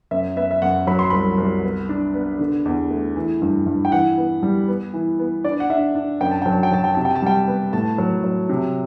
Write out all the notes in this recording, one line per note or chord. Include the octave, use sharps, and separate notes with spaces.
F#2 E5
B3 E5
E5
F#2 F#5
F#3 B5
C6
C2 B5
C2
B3
D4
B3
D3
E2
A3
E3
G2
G2
G5
E3 F#5
B3
G3
B3
E3
B3
D4 D5
F#5
D4 E5
D4
F#2 G5
A5
F#3 G5
A5
G5
F#3 A5
G5
C3 A5
G5
A5
G3 G5
B3
A2 A5
F#3
F#3
C3